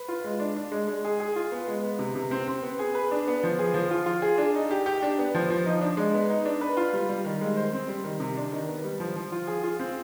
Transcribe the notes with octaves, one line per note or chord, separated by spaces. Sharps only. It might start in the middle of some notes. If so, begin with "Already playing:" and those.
Already playing: B4
F4
G#3
D4
D4
G#3
G#3
G#4
G#4
F4
B3
G#3
B3
C3
C3
C4
C4
B3
G#4
B4
D4
B3
F3
G#4
F3
F4
F4
G#4
D4
D#4
G4
G4
D4
B3
F3
F3
D#4
D4
G#3
B3
D#4
D4
B4
F4
G3
G3
D#3
G#3
C5
C4
G3
D#3
C3
D4
D#3
B3
G3
F3
F3
F4
G#4
F4
C4